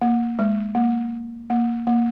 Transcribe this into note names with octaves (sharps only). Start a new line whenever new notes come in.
A#3
G#3
A#3
A#3
A#3